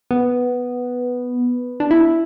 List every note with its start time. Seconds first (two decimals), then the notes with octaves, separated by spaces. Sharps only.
0.11 B3
1.80 D4
1.91 E4